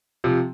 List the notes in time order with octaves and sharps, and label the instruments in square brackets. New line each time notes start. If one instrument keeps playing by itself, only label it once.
[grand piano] C3 F3